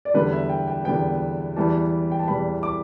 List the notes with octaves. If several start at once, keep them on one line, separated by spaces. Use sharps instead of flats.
D5
E2 D3 G3 B3 B4
E5
G5
G5
E2 D3 G3 B3 G5
E2 E3 G3 B3 A5
G5
A5
E2 E3 G3 B3 B5
D6